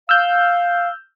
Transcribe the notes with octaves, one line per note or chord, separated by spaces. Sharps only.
F5 E6 F6 G6